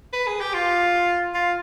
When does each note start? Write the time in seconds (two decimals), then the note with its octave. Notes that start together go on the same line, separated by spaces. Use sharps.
0.13 B4
0.27 G#4
0.40 G4
0.53 F4
1.34 F4